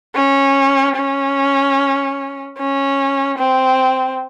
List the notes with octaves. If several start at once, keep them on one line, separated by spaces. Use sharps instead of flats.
C#4
C#4
C#4
C4